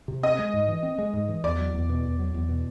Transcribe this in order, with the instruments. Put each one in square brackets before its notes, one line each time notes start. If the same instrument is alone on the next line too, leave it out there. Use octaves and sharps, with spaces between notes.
[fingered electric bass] C3
[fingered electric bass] C4 [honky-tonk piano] D#5
[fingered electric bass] G#3
G#2
E3
C4
G#3
G#2
E3
[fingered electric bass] E2 [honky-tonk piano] D5
[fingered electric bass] F#3
E2
B2
E2
F#3
E2
B2